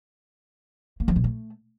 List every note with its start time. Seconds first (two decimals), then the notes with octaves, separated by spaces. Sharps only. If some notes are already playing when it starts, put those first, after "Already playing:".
1.00 A#3
1.08 F3
1.16 B2
1.24 A3